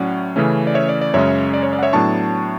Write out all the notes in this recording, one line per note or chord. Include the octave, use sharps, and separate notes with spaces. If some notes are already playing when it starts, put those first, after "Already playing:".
Already playing: A2 F#3 C#4 D5 F#5
C#3 E3 A3 C#4
D5
C#5 E5
D5
D5
F#2 C#3 G#3 C#4 C#5 E5
D5
C#5
D5
F#5
C#5 E5
A2 F#3 B3 D4 A5 C#6